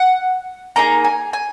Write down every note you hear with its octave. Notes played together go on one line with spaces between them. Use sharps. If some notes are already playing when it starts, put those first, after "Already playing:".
Already playing: F#5
A#3 D#4 G#4 A#5
G#5
G#5